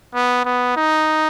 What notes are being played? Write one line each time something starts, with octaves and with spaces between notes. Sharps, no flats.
B3
B3
D#4